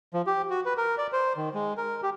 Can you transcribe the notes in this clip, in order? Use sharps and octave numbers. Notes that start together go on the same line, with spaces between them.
F3
G4
F#4
B4
A#4
D5
C5
D#3
G#3
A#4
G4